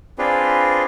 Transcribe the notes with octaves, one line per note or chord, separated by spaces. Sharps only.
C4 D4 F4 G#4 B4